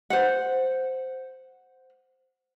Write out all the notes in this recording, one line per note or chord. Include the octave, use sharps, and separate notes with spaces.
C5 F#5